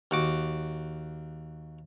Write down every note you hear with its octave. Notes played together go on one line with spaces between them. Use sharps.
D#2 F#4 D6